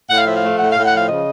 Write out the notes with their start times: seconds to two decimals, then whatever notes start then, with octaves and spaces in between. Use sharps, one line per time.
0.09 A2 F#5
0.18 F5
0.26 F3 E5
0.35 F5
0.42 A3
0.59 A2 F#5
0.71 F5
0.75 A2
0.84 F#5
0.92 F3 F5
1.09 C#3 D#5